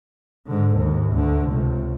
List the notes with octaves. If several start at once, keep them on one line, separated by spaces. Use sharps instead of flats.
G#2 D3
D#2 G#2
D2 D3
C#2 C3